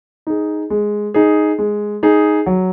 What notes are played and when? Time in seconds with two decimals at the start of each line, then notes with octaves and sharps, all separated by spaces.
0.27 D#4 G#4
0.70 G#3
1.14 D#4 G#4
1.59 G#3
2.03 D#4 G#4
2.46 F#3